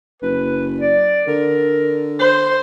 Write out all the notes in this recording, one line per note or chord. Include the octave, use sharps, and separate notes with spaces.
F#1 B4
D5
D3 A#4
C5